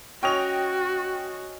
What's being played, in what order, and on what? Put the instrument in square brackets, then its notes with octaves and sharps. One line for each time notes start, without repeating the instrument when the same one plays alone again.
[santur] C#4 D#5 [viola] F#4 [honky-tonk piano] G5 F7